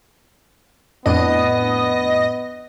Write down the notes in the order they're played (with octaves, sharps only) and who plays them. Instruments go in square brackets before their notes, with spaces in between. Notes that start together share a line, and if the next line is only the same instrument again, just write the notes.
[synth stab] F2 A2 D4 [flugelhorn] B3 [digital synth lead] D#5